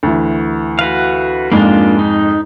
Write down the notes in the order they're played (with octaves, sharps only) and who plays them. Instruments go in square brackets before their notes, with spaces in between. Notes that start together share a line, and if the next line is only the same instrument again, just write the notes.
[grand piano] D2 E3
[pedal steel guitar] F#4 B4 F5
[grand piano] F2 G#2 G#3 [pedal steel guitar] A#3 D4 F4
[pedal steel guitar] D#4